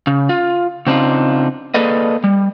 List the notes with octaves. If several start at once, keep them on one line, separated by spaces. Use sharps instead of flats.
C#3
F4
C#3 C4 D4 D#4 F4
A#3 G#4 A4 B4 D5 D#5
G3